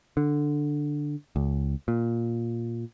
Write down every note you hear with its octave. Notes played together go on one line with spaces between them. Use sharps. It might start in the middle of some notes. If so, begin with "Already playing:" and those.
D3
C#2
A#2